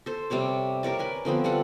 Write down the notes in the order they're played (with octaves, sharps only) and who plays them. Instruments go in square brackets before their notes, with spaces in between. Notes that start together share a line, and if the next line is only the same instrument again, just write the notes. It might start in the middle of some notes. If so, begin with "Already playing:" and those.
[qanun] A4 C5
C3 G3 C#5 D5
G4 A#4 C#5 D5
A#4 B4 G#5
D3 F3 B3 C4
G3 F4 A4 F#5